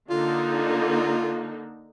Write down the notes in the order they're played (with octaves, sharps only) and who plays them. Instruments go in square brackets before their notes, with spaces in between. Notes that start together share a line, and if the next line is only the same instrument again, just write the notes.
[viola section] D3 A#3 D#4 [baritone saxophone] F4